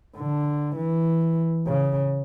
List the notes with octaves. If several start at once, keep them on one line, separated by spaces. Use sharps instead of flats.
D3
E3
C#3